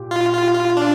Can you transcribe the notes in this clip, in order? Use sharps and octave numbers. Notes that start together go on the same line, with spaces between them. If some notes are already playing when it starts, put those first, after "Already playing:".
Already playing: A#2 G4
F4
F4
F4
D4